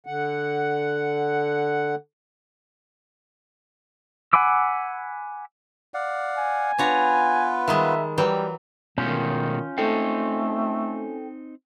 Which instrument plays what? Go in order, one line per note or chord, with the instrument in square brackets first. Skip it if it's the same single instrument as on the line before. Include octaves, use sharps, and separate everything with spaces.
[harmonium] D3 F#5
[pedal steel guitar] F#5 G#5 B5 D6 E6
[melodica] D5 F5 F#5
[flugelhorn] G#5
[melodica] B3 F4 B4 [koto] D4 C#5 A#5
[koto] D#3 G3 G#3 [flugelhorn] E5
[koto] E3 F#3 G5 [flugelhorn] G3
[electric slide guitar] B2 G#3 A3 [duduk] D#3 [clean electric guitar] C#4 F4 [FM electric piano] G6
[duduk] A3 [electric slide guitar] C4 D#4 [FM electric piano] A4 G5